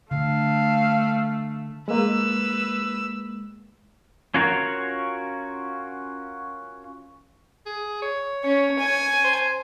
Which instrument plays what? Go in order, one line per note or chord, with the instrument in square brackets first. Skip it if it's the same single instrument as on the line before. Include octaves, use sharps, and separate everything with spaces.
[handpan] D3 [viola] A3 [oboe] F5
[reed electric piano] G#3 A#3 [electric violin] B4 E6
[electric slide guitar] C#4 F4 F#4 A#4 C#5
[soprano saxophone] G#4
C#5
[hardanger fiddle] C#4 [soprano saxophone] C#5
[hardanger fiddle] G#5
[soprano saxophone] C5